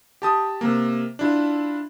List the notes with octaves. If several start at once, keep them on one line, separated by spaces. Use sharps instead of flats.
G4 A5 D#6
C3 A#3
D4 E4 F4